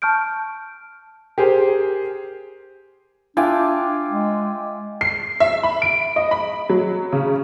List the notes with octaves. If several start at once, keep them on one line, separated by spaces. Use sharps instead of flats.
A5 C#6 F6 G6 D7
G4 G#4 A#4 C5
D4 F4 E5 G5 G#5 D6
G#3
C7
E5
B5
D7
D#5
B5
F#3
C#3